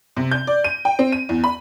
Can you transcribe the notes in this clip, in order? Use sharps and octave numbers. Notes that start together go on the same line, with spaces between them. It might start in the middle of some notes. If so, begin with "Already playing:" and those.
C3
G6
D5
D#7
G5
C4
D#7
E2
B5